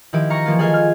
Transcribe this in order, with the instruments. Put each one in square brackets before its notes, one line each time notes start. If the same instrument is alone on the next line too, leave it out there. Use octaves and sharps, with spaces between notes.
[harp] D#3 F3 E4 G4 D7 D#7
F5 A#5 C#6 A#6 C#7
E3 F3 A#3 F4
G#4 A4 D#5 F5 G#5
F6 G#6